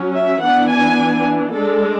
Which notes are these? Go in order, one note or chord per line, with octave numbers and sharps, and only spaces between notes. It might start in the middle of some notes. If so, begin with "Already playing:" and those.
Already playing: F#3 C#4
E5
E3 B3 D4 F#5
G#5
G#3 D4 A4